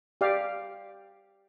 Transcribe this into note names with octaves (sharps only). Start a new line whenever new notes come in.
G4 D5 F5